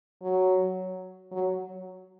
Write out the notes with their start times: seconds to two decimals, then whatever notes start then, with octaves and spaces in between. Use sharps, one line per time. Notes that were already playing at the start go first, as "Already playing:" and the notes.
0.22 F#3
1.32 F#3